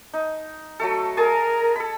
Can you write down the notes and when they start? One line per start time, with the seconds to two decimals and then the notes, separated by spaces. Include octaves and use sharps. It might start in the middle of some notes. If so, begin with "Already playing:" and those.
0.14 D#4
0.80 F#3 A3 A4
1.17 G#4 A#4 A5 D#6
1.76 A4 B5